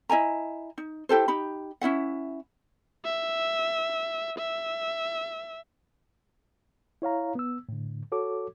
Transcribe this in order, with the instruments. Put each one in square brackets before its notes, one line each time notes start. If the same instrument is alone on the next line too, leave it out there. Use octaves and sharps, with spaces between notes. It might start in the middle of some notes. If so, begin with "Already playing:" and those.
[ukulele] E4 D#5 G#5 A#5
D#4
E4 G4 A4 C5
D#4 G4 B5
C#4 E4 E5 F#5
[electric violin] E5
E5
[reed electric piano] E4 C#5 F5 A#5
B3 E6
A2 D3
F#4 A4 C#5 D6